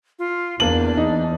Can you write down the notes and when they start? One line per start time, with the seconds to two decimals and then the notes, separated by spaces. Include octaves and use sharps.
0.19 F4
0.60 E2 A#3 D4 F#7
0.97 D#4